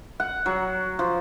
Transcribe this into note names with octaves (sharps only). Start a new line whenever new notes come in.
F#5
F#3
F3